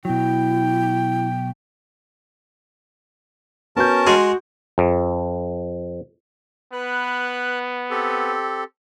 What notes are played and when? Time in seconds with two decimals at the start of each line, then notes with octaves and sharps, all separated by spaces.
0.05 B2 F#3 E4 G5
3.76 B3 C#4 F#4 A#4 A5 G6
4.07 G#3 F#4 G#4 C6
4.78 F2
6.73 B3 B4 F#6
7.91 C4 G4 A4